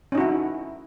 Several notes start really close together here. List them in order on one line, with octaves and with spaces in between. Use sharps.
C#4 D#4 F#4 E4